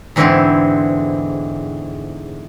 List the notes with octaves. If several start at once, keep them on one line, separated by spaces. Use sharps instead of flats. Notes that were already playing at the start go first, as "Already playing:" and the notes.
E2 G#2 D3 E3 C4 C5